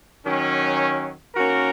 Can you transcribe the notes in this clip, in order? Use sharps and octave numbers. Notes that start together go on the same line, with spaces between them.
D#3 F#3 C#4
D#3 A#3 C#4 F#4 A#4